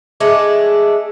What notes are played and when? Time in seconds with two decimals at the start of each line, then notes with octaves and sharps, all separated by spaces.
0.20 G#3 A3 D4